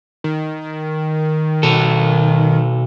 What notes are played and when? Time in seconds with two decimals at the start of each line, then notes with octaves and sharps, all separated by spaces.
0.24 D#3
1.63 B2 A4